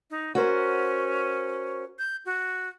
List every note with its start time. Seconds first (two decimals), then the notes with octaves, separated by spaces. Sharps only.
0.10 D#4
0.35 C#4 F#4 A#4 C5
1.99 G6
2.25 F#4